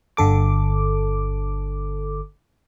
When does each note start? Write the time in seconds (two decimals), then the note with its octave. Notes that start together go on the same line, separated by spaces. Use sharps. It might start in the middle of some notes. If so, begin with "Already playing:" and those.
0.17 G1 D3 A4 D6